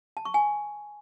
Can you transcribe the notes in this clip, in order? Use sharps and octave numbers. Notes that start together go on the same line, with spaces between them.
A5
C#6
G#5